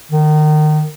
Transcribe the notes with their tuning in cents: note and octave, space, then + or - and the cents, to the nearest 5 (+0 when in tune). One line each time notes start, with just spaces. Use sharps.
D#3 -30